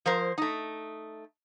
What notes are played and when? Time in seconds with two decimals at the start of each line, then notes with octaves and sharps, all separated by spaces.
0.06 F3 A#4 C5
0.38 A3 D#4